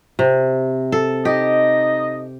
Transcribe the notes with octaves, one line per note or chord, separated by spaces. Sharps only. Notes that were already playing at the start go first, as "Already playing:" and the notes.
C3
A4
D#4 G4 D#5